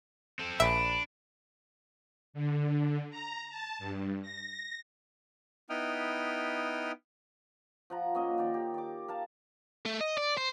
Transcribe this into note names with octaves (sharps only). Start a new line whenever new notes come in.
C4 A4
A#1 D4 E5 B5
D3
A#5
A5
G2
A#6
B3 D#4 E4 G5 D#6 F6
F3 F#5 A#5
A#3 C#4 D#5
D#3 D5
G4
D5 D6
A#4 F5 A5
A3
D#5
D5
C5